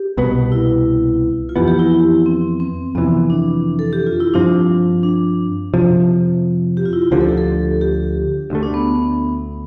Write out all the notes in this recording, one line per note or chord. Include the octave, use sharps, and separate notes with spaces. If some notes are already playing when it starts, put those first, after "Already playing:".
Already playing: G4
C2 B2 B3
E4
F4
F2 E3 B3 G4
G4
E4
E4
C4
C4
F2 C3 E3 B3
D4
A4
G4
F4
E4
G2 F3 C4 D4
D4
F2 C3 F3
G4
F4
E4
F4
D2 D3 F3 G4
A4
G4
A4
G4
D2 D3 A3
D4
B3